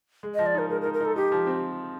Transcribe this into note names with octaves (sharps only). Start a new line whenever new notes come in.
G#3
F3 D#5
D5
D#4 A#4
G#3 A#4
A#4
D#4
A#4
D#4 A4
D#4 G4
F3
C4